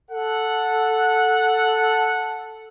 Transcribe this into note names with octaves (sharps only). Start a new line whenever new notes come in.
A4 F#5